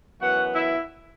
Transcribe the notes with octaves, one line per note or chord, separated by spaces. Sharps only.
F#2 E3 B3 F#4 F#5
E4 E5